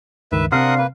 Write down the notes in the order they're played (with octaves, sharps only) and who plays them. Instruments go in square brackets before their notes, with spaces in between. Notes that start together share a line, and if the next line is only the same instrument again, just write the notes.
[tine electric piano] C#2 G2 D#3 [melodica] B4 E5
[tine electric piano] C3 C4 [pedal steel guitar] D4 C5 F5 [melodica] A#4 F#5 D#6
[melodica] A#3 B4